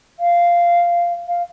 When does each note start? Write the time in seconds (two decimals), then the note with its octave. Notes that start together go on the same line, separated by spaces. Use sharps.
0.20 F5
1.28 F5